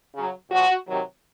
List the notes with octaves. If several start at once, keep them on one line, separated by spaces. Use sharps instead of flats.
C#3 F#3
A#2 F3 F#4
C3 D#3 F#3